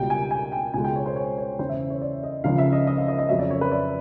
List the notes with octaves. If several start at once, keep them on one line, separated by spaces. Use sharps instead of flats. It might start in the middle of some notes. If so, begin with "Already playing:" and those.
Already playing: C#2 B2 G3 G5
G#5
G#5
G5
C#2 B2 G#3 G#5
G5
C#5
C5
C#5
C#5
E2 C#3 E3 C5
E5
C#5
D5
D#5
C#2 C#3 F3 F5
E5
D#5
D#5
F5
D#5
D#5
F2 C#3 F#3 E5
D5
C#5
B4
D5